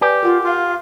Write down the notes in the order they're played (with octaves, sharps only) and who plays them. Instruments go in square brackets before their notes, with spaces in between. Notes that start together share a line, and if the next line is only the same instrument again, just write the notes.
[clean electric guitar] G4 [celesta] B4 D5 G#5
[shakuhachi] F4 [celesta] A#4 F#5
[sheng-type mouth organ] F4 [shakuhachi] F5